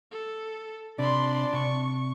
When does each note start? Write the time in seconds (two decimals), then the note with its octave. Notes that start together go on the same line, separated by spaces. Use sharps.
0.12 A4
0.99 C3 D4 B5 C6
1.53 C3 C#6